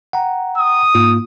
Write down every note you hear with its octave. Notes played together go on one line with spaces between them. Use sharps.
F#5 G5 A#5
D#6
G#2 A#3 F4